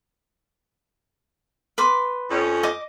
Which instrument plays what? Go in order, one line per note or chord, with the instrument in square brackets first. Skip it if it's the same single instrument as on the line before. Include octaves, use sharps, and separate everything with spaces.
[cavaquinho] B4 C6 D6
[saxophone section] F2 C#4
[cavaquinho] D#5 D6